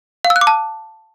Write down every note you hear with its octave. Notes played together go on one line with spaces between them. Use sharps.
F5
E6
F#6
D6
A5